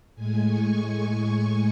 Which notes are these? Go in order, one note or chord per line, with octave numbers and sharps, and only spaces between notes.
A2 G#3 G#5
C#6